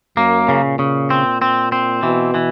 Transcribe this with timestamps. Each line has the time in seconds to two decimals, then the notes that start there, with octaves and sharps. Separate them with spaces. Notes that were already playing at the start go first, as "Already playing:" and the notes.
0.17 F#2 A#3
0.49 C#3
0.64 A#2
0.79 C#3
1.10 C4
1.42 C4
1.72 C4
2.03 B2 E3
2.34 E3